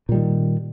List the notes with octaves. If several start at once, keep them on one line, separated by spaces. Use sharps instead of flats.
A#2 D#3 G3